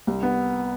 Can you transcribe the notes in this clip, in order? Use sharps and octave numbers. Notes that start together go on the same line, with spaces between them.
C2
B3